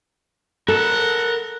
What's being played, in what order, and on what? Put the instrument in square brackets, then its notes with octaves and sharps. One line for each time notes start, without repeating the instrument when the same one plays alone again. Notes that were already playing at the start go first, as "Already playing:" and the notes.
[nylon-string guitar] A4 [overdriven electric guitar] A#4 A5 [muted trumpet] F#5